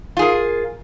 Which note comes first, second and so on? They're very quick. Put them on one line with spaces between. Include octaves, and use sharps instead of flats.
F4 G#4 A#4